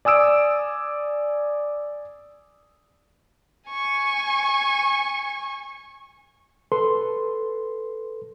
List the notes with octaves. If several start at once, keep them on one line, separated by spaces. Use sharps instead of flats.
D5 G#5 D#6 E6 D7
G#5 C#6
A4 B4 C6